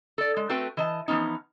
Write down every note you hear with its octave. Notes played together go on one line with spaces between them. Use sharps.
A4 D5
G#3
A3 C4 F#4 B4 G5
E3 D#5 A5
E3 F3 B3 C#4 D#4